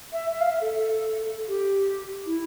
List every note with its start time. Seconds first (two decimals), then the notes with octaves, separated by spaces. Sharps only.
0.13 E5
0.31 E5
0.40 F5
0.50 E5
0.61 A4
1.48 G4
2.26 E4